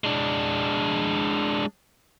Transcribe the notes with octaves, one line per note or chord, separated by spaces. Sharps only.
G#3 D4